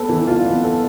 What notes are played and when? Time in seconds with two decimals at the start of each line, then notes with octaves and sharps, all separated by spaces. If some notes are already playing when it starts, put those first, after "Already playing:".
Already playing: B3 A4
0.09 E3
0.27 F4
0.46 B3
0.64 A4